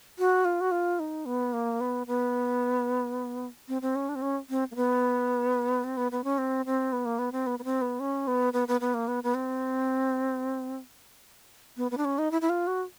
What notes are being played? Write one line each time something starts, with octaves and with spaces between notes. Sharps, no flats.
F#4
F4
F#4
F4
D#4
B3
A#3
B3
B3
C4
C4
C#4
D4
C4
C#4
C4
A#3
B3
C4
B3
B3
C#4
C4
C4
B3
A#3
B3
C4
B3
B3
C4
B3
C#4
B3
B3
B3
B3
A#3
B3
B3
C4
B3
B3
D4
C#4
D#4
E4
E4
F4
F#4